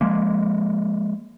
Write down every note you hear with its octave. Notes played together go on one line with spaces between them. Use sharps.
F3 G#3 A#3